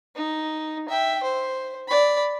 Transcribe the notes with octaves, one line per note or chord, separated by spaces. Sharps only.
D#4
E5 G5
C5
D5 B5